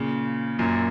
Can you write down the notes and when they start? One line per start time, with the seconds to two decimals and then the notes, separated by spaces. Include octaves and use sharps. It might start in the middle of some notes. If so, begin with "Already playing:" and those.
Already playing: A#2 C#3
0.59 F#2 A#2